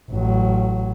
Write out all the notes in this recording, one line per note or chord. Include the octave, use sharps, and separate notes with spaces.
A1 F#3